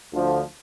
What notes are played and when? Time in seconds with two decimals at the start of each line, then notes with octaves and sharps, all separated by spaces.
0.12 D2 D3 F3